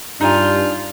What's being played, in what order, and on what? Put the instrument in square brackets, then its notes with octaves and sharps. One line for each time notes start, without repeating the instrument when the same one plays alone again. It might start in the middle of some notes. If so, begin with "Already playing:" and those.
[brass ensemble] G2 [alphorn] D4 [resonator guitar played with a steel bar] D#4 G#5 [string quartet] F4